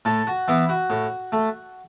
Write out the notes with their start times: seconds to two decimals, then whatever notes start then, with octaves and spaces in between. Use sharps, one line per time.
0.05 A2 A4
0.27 F#4
0.48 E3 B3 E4
0.69 F#4
0.90 A2
1.32 A3